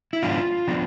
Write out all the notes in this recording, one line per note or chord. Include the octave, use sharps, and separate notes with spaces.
E4
G#2 F3 B3 D4 F4
F3 B3 D4